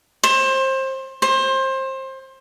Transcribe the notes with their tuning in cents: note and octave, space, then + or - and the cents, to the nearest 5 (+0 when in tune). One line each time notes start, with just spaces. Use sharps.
C5 +25
C5 +25